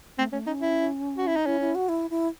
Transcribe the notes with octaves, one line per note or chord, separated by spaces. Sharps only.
A3 C4
A3 C#4
C#4 D#4
E4
F#4
E4
D#4
C#4 E4
E4
F#4
E4
E4